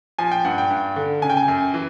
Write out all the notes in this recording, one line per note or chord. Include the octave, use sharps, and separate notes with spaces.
F3 G#5
G5
G2 F#5
G5
G2
D3
C#3 G#5
G5
G#5
F#2
E3